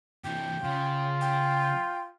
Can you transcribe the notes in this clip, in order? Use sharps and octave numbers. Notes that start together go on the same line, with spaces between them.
C3 E3 G5
C#3 F4
G5